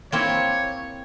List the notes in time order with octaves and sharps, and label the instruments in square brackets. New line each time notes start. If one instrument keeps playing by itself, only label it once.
[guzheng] A#3 C4 E4 [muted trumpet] C#5